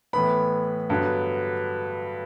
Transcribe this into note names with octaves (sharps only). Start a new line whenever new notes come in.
A2 E3 B3 B5
G2 D3 F#3 B3